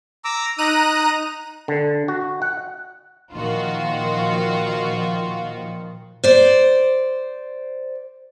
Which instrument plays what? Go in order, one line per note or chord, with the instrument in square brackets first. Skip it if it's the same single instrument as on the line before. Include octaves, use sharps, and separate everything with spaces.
[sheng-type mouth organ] A#5 D6 E6
[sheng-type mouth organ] D#4 [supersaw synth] A#5 F#6 D#7
[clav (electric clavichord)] D3
F#4
F#5
[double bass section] A#2 D#3 F3 [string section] F4 F#4
[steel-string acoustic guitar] C5 D5